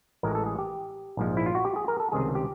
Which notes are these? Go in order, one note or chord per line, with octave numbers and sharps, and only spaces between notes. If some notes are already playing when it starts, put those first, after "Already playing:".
A1 A2 E3 G#3 A#4
A4
G#4
G4
A#1 G#2 F3 G#3
E4
F4
F#4
G4
G#4
A#4
A4
C#2 C3 D#3 G3 G#4
G4